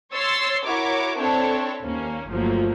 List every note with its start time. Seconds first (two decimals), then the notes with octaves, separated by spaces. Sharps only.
0.12 C#5 C6 E6 A6 C7
0.65 E4 F#4 A#4 C#5 D6
1.18 C4 D4 E4 A4 C#5
1.83 D#2 A#3 C#4
2.29 G1 F3 F#3 A3 A#3